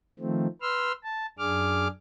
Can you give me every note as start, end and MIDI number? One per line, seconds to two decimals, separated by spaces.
0.19 0.47 51
0.19 0.47 53
0.19 0.47 57
0.19 0.47 60
0.62 0.92 71
0.62 0.92 84
0.62 0.92 88
0.62 0.92 89
1.04 1.26 81
1.39 1.88 42
1.39 1.88 62
1.39 1.88 68
1.39 1.88 86
1.39 1.88 89